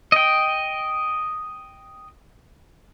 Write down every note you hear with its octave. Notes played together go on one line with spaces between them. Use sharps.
D#5 G5